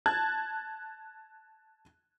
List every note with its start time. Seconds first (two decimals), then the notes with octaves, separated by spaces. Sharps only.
0.06 A5 F#6 G#6 A6